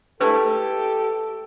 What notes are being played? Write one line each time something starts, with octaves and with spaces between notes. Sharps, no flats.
G#3 A3 E4 G4 A4 B4 A5